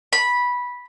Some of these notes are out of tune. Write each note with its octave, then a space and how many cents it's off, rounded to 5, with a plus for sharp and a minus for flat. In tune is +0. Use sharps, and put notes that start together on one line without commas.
B5 -10